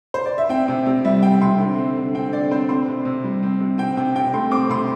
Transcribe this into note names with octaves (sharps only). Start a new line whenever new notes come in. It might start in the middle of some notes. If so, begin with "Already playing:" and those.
C5
D5
E5
C4 G5
C3
C3
G3 E5
C4 G5
C3 C6
D3
C4
D3
C4 G5
D3 D5
C4 C5
C4 C6
C3
C3
G3
C4
C3
C4 G5
C3 G5
C3 G5
A3 C6
C4 D6
C3 C6